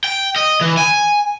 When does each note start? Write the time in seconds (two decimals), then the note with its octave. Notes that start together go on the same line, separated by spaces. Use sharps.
0.04 G5
0.36 D#5
0.61 E3
0.78 G#5